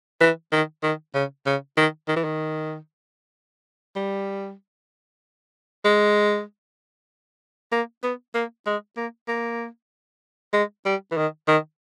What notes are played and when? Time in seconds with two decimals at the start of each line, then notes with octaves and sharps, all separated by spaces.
0.21 E3
0.52 D#3
0.83 D#3
1.14 C#3
1.46 C#3
1.77 D#3
2.08 D#3
2.16 E3
2.25 D#3
3.96 G3
5.85 G#3
7.72 A#3
8.03 B3
8.35 A#3
8.67 G#3
8.97 A#3
9.28 A#3
10.53 G#3
10.85 G3
11.12 E3
11.17 D#3
11.48 D#3